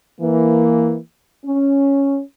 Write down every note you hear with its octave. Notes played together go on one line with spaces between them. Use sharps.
E3 A#3
C#4